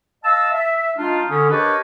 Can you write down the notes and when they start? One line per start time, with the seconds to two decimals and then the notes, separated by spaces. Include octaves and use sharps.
0.24 D#5 F5 A5 E6
0.53 E5
0.98 G#3 D4 D#4 F4
1.30 D3 C#4 D#6
1.50 D4 G4 A#4 B4 C#5 D#5